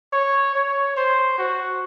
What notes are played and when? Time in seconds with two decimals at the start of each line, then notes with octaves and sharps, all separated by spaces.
0.13 C#5
0.55 C#5
0.96 C5
1.38 F#4